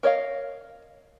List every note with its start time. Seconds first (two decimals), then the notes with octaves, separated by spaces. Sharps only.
0.03 A#4 C#5 D#5 F5